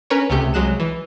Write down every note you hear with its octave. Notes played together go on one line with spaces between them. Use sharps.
C#4 A#4 B4 C#5
C#2 C3 A3 G4 G6 C#7
C2 F#3 G#3 F#6 E7
E3